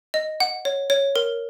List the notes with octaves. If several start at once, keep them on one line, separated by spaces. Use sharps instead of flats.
D#5
F#5
C#5
C#5
A#4